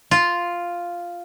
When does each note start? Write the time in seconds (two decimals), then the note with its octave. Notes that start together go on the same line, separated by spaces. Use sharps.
0.11 F4